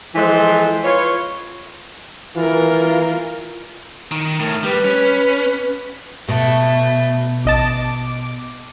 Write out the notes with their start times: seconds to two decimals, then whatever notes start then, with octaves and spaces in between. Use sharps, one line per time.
0.15 E3 F3 G#3 A4 C5
0.84 F4 B4 C#5
2.36 E3 F4 A#4
4.11 D#3
4.39 A2 A#4
4.64 G3 B4
4.84 C#4
6.28 B2 A3
7.45 A1 D#5 A5 D6